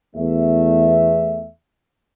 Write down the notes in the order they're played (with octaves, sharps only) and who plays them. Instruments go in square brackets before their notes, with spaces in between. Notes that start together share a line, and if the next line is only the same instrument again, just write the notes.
[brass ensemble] E2 A3 E5